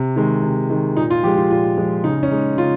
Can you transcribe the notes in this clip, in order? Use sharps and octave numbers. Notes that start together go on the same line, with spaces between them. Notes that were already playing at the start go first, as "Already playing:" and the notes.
Already playing: C3
D#3 G#3
C3
D#3 G#3
A#2 D#4
F4
F3 G#3 G4
F4
A#2 F4
F3 G#3
C#3 D#4
C#4
G#3 D#4
C#3 F4